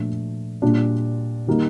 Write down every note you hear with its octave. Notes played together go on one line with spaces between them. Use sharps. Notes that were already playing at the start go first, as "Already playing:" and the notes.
Already playing: A#2 F3 A3 D4
A#2 G3 D4 F4
D#3 G3 A#3 D#4